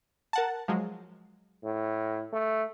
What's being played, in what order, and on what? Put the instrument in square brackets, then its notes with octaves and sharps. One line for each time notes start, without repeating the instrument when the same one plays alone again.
[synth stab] A#4 F#5 A5
F3 F#3 G#3
[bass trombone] A2
A3